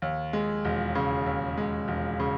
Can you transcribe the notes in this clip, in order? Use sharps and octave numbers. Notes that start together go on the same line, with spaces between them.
D#2
G#3
E1
C#3
D#2
G#3
E1
C#3